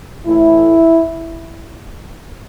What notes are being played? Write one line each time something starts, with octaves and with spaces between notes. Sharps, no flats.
A2 E3 A3 E4